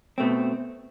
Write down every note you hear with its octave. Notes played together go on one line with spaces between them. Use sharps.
B2 A3 C4